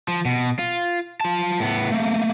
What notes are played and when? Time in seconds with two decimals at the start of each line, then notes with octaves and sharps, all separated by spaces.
0.08 F3
0.25 B2
0.59 F4
1.21 F4 A5
1.60 A2 B3
1.92 A3 A#3